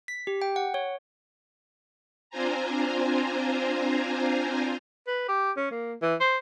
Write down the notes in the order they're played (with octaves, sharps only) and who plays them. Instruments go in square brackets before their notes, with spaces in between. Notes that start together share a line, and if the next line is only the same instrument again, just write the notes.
[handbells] B6
G4
G5
F#5
C#5
[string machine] C4 D4 F4 C5 G#5 A#5
[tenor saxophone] B4
G4
C#4
A#3
E3
C5